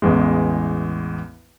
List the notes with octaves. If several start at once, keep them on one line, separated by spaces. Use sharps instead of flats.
A1 E2 G#3